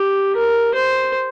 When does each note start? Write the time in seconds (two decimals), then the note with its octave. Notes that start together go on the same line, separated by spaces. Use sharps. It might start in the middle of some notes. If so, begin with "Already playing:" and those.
Already playing: G4
0.36 A#4
0.74 C5